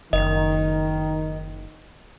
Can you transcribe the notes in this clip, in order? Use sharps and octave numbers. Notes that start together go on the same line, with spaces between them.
F#1 D#3 D#5